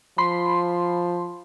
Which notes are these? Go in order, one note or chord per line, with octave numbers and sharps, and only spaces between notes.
F3 B5 C6